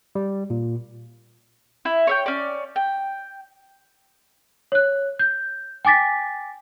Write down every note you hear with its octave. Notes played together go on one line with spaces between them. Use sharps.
G3
A#2
E4
C#5 E5 G5
C#4 D5
G5
C#5 F#6
G6
G5 G#5 D6 A6 B6